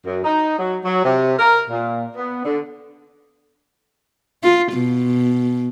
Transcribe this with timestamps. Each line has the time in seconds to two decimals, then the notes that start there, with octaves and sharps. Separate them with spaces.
0.06 F#2
0.24 D#4
0.57 F#3
0.84 F#3
1.04 C3
1.39 A#4
1.69 A#2
2.15 B3
2.44 D3
4.43 F4
4.73 B2